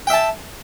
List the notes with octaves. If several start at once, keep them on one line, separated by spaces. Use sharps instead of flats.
E5 G5 A5